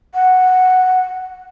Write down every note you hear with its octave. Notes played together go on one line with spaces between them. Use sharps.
F#5